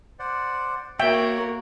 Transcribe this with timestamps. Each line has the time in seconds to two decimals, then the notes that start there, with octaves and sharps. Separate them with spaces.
0.19 C5 D5 F#5
0.99 A#3 F#4 C#5 E5 G5